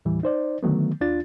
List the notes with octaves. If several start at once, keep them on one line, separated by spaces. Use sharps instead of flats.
D#2 A2 E3 G3
D#4 C5 D5
D3 D#3 F#3 A3 B3
D#2 D4 F4 A6